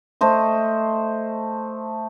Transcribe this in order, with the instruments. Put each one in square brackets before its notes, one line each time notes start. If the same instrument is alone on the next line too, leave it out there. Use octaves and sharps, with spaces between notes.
[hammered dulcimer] A3 C5 D#5